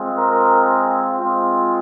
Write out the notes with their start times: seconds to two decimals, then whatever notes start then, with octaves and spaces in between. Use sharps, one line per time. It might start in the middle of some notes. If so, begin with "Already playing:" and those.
Already playing: G#3 C4 F4
0.16 A#4
1.17 G#3 C4 F4